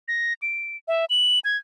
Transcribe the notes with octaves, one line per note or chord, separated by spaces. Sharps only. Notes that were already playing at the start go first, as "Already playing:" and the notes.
A#6
D7
E5
F#7
G#6